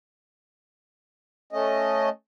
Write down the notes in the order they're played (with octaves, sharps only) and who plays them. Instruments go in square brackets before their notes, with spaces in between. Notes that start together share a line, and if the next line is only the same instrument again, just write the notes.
[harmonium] A3 C#4 D#5